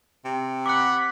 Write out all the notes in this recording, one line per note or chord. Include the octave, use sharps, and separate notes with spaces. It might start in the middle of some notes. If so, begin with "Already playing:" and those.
C3
F#5 B5 D6 F#6